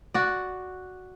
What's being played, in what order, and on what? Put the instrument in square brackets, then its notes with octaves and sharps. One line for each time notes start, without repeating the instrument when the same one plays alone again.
[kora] F#4 D5